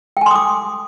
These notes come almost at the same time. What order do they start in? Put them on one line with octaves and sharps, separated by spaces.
G5 G#5 C6 D#6 D6